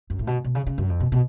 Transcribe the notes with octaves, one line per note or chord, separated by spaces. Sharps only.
F#2
A2
B2
B2
C#3
C#3
F#2
F2
B2
B2